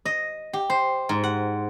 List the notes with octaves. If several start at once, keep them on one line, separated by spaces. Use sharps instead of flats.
D#5
G4
C5
G#2
F#5